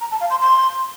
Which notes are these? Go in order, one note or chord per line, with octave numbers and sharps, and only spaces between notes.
A#5
A5
F5
C6
C6